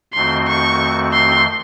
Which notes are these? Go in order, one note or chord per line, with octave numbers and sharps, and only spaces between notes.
F2 D#3 A3 C4 F#4 C6
C#6
C6